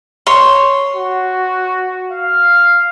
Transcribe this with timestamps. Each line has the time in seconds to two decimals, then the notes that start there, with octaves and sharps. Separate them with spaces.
0.27 C#5 C6
0.95 F#4
2.11 F5